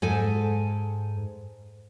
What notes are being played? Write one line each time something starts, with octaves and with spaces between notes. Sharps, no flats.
G#2 A4 G#5